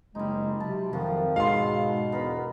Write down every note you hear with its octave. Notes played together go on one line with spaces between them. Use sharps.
F#1 G3 G#3 D#4
C3 F#3 A5 B5
F2 D#3 F3 F#4
G#2 B2 F#3 B3 A4 F5 C6
E1 B3 A#4 B5